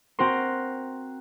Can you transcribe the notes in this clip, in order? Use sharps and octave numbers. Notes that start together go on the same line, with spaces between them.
C4 F#4 A#4 C6